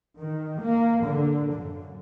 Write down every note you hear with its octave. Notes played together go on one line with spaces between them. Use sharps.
D#3
A#3
D3
F#2